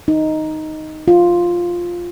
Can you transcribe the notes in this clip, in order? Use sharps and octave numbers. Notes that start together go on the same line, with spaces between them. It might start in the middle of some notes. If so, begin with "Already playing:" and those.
D#4
F4